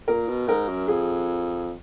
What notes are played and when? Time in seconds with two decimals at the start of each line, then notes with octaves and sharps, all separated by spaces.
0.07 A#2 A#4
0.28 B2
0.48 G#2 A#4
0.69 F#2
0.88 F2 G#4